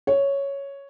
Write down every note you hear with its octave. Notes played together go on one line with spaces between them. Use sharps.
C#5